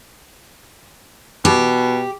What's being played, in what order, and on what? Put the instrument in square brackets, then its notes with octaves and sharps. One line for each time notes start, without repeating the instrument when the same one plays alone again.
[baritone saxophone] B2 [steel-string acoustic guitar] G4